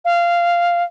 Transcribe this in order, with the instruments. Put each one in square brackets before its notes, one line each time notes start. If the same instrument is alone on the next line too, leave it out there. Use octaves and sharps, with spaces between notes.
[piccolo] F5